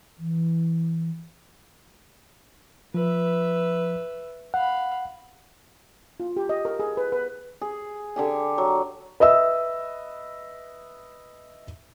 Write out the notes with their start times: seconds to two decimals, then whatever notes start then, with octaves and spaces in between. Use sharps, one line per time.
0.19 E3
2.94 F3 B4 E5
4.54 F5 F#5 B5
6.20 F4
6.37 G4
6.49 D#5
6.65 A#4
6.80 G#4
6.97 B4
7.12 B4
7.61 G#4
8.16 D3 G4 G#5
8.58 F#3
9.20 B4 D#5 E5 E6